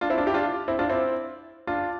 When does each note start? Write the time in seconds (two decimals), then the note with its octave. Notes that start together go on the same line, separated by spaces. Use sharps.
0.01 D4 F4
0.10 C4 E4
0.18 D4 F4
0.26 E4 G4
0.34 D4 F4
0.68 C4 E4
0.79 D4 F4
0.90 C4 E4
1.67 D4 F4